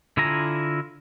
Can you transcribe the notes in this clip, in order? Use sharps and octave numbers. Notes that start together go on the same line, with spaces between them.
D3 E4 F4 G#5 A#5